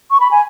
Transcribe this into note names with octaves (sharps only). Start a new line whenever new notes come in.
C#6
B5
G#5